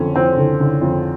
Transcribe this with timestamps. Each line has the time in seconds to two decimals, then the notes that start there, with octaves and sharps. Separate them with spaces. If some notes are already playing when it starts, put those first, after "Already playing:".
Already playing: F2 D3 C#4
0.16 F2 C4
0.38 D3
0.60 D3
0.81 F2